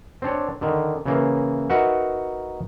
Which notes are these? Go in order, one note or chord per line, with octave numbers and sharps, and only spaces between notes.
C4 D4 C#5
D3 D#3
C#3 E3 A#3
D#4 F#4 A#4 B4 E5 F#5